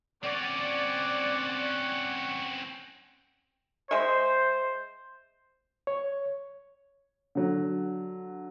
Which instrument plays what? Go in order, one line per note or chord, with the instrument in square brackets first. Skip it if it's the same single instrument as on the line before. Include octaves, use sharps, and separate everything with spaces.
[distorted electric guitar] C4 C#4 [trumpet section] C#5 F#5 [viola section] D5
[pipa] G#3 E5 [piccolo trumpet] C5
[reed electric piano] C#5
[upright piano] D3 F#3